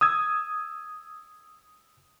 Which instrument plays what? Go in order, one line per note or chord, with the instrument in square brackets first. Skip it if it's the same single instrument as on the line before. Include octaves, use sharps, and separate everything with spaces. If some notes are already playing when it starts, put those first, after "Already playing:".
[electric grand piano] D#6 E6 G#6